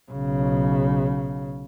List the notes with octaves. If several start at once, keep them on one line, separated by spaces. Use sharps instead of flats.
B1 C#3